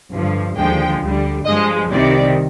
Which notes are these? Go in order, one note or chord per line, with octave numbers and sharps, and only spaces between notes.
G2 D3 F3
D#2 D3 F3 G#3 G5
D2 D3 G3
G2 F3 G#3 D#5
C2 C3 D#3 G3 D5